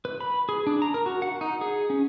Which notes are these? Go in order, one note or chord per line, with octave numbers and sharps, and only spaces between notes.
B4
B5
G#4
D4
A#5
A#4
F#4
F#5
D#4
G#4
C#4